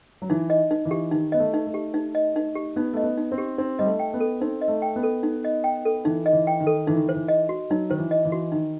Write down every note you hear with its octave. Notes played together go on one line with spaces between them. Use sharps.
F#3
E3 D#4
D#5
D#4
E3
G4
D#3 D#4
B3 D#5
A3
D#4
A3
G4
D#4
D#5
D#4
G4
B3 D#4
A3 D#5
B3
D#4
C4
G4
C4 D#4
G3 D#5
A3
G5
B3
A4
C4 D#4
D#5
A3
G5
B3
A4
D#4
D#5
G5
A4
E3 D#4
D#5
E3
G5
D#3
A4
E3 D#4
D#3
E3
C5
E3
D#5
F#4
F#3 D#4
D#3 C5
E3
D#5
E3
F#4
D#3 D#4